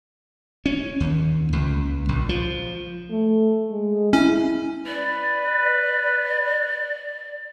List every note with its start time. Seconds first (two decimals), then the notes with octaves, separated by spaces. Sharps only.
0.66 C#4
1.00 D#2
1.53 C#2
2.09 A#1
2.29 F3
3.10 A3
3.71 G#3
4.13 C#4 E4
4.86 B4 D5